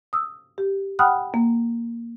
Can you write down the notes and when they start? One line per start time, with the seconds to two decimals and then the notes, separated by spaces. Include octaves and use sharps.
0.13 D#6 E6
0.58 G4
0.99 F#5 G5 B5 D#6 F6 F#6
1.34 A#3